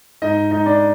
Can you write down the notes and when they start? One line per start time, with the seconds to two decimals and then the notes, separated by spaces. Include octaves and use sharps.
0.22 G#2 D#4 D#5
0.51 G#2 D#4 D#5
0.66 D4 D5